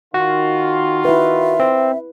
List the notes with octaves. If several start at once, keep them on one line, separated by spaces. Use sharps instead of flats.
D#3 F4 F#4
E4 B4 E5
C4